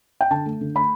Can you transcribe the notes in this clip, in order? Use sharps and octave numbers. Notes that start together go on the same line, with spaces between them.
G5
D3 A5
A3
D3
A3 B5